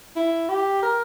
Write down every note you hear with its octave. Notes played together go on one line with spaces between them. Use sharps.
E4
G4
A#4